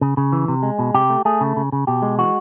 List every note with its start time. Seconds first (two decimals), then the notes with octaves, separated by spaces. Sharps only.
0.01 C#3
0.17 C#3
0.33 E3
0.48 C3
0.63 G#3
0.79 B2
0.94 C3 G4
1.10 A3
1.25 A3 G#4
1.41 C#3
1.56 C#3
1.72 C#3
1.87 B2 G4
2.02 G#3
2.18 E3 F#4